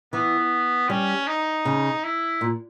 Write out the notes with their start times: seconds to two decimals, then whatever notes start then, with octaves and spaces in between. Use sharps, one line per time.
0.13 E3 B3
0.89 G3 C#4
1.27 D#4
1.65 C#3
2.04 E4
2.41 A#2